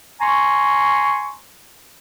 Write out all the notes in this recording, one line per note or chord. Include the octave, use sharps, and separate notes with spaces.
G#5 A#5 C6 C#6